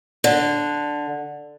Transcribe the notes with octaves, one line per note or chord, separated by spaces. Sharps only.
D3